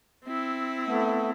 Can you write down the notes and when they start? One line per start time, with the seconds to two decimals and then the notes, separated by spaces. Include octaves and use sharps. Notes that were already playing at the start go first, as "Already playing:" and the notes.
0.25 C4 E4
0.87 A3 B3